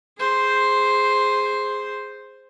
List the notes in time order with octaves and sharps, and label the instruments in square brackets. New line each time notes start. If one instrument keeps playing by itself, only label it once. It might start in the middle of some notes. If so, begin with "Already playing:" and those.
[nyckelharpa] G#4 C5